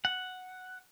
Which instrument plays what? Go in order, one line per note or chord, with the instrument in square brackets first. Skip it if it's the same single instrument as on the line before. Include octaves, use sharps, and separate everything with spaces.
[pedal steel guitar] F#5